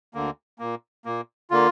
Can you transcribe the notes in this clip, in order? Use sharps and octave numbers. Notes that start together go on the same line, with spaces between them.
D2 D3 A#3
A#2 A#3
A#2 A#3
D3 A#3 F4